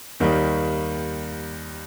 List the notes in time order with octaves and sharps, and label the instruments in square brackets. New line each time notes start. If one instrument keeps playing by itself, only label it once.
[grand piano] D#2 D#3 G3